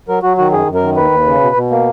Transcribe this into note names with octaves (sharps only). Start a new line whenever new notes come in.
F#3 A#4
F#3 F#4
D#3 F#4
F#2 G#4
F#2
A#4
D#3
D#2 B4
D#2
C#3
B2
B2
A#3